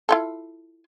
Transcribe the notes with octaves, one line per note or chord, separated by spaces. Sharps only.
E4 F4 A4